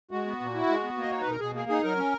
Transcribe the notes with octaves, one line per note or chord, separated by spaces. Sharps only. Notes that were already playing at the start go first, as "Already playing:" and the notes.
G#3 F#4
B3
A#2
E4
G#3
B3
A#3 D#5
D#4 C#5
B4
B2 A#4
B2 G#4
A#3 G#4
D#4 G#4
F#3 A#4
C#4